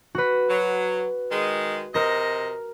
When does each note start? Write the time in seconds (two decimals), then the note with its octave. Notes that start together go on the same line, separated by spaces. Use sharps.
0.15 F#4 B4
0.50 F#3
1.32 D#3 G#3
1.94 C3 A#4 D#5 A#6